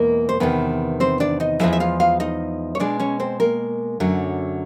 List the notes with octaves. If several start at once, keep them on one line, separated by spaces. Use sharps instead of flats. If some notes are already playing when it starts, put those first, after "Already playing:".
Already playing: E2 B2 G#3 A#3 A#4
C5
E2 C3 D#3 B3 B4
C4 C5
D4 D5
D#4 D#5
E2 C#3 F3 G#3 E4 E5
E5
F4 F5
F4 F5
D#4 D#5
C#5
B2 G#3 D4 D5
C#4 C#5
C4 C5
A#3 A#4
F#2 D3 F#3 A3